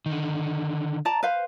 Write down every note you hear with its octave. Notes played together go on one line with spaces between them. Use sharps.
D3 D#3
D5 A5 A#5
B4 C5 F5